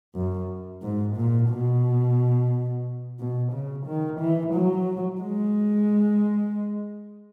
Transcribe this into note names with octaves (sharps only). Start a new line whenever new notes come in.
F#2
G#2
A#2
B2
B2
C#3
D#3
E3
F#3
G#3